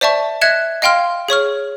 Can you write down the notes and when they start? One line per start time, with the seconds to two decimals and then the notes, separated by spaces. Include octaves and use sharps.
0.01 C5 D5 E5 A5 C#6
0.41 D#5 E5 F#6 G#6 C#7 E7
0.82 D#5 F5 G5 C6 F6
1.28 G#4 C#5 C#6 F6